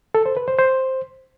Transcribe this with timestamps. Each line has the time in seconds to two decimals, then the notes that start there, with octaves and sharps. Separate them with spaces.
0.15 A4
0.26 C5
0.37 B4
0.48 C5
0.59 C5